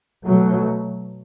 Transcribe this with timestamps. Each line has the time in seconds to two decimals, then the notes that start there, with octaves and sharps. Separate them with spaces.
0.24 B2 F#3 A3